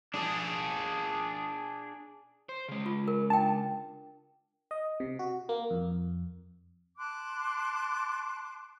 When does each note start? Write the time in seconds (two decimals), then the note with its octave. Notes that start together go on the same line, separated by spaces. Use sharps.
0.14 D4 G#4
2.49 C5
2.69 C#3 G#3
2.86 F4
3.08 A#4
3.30 D4 G5 A5
4.71 D#5
5.00 C3
5.19 F#4
5.49 A#3
5.71 F2
6.98 A5 C6 D6 F#6